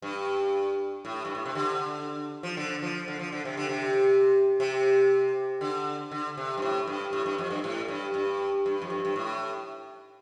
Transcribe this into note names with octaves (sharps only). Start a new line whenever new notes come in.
G2
A2
G2
A2
C3
D3
F3
D3
F3
D3
F3
D3
C3
D3
C3
C3
D3
D3
C3
G2
A2
G2
A2
G2
F2
G2
A2
G2
G2
G2
F2
G2
G2
A2